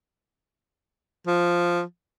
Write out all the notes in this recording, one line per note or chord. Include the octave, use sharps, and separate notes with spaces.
F3